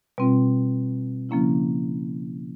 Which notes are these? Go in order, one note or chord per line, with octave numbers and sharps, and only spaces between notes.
B2 G3 C4 F4
C#3 F3 A#3 C#4 E4